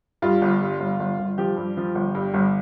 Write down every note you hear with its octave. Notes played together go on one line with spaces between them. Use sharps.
G2 F4
G1
G2
G1
G1
G1
F3 G4
G2
F3
G1
G2
G1